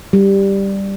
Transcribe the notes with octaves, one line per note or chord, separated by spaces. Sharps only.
G3